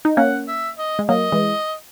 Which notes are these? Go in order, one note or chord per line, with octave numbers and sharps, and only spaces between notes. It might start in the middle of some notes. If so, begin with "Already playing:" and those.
D#4
A#3 C#4 F#5
E5
D#5
G#3
F#3 A#3 D#5
E3 G#3